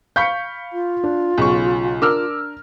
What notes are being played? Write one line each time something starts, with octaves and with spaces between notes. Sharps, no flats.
F5 B5 C#6 G6 B6 C#7
F4
D4
B1 C#3 C#6
D4 A#4 D6 E6 F6